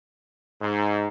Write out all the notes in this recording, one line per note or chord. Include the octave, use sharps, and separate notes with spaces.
G#2